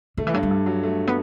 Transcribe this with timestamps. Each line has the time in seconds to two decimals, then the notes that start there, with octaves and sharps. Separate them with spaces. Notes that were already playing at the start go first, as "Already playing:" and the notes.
0.17 D3 A3
0.27 E3
0.34 G2 F#3
0.43 G3
0.51 G2
0.66 F#3
0.83 A3
1.07 B3